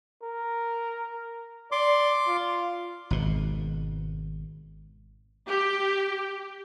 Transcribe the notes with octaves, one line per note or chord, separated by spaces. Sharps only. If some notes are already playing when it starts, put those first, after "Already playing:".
A#4
D5 C6 D6
F4
G#1 B2
G4